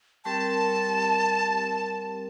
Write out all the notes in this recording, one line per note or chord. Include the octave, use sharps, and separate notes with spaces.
G3 C4 G4 A#4 A5